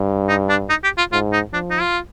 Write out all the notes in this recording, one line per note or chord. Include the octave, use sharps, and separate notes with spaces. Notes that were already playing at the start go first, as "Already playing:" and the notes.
Already playing: G2
D#4
D4
D#4
G4
F4
G#2 F4
D#4
F3 D4
D#4
F4